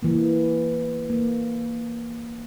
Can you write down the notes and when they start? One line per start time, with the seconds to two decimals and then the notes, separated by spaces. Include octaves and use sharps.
0.03 E3 A#3
1.10 A#3